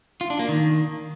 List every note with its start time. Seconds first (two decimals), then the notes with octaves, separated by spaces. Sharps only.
0.21 F4
0.30 D4
0.39 A#3
0.49 D#3